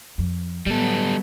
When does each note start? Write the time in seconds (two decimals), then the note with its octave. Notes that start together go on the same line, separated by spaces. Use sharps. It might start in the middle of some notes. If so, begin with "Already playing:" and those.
0.18 F2
0.66 A2 F#3 G3 B3 A4